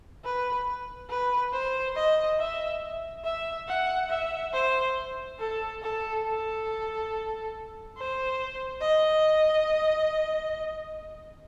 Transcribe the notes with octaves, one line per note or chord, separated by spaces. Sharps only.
B4
B4
C5
D#5
E5
E5
F#5
E5
C5
A4
A4
A4
C5
D#5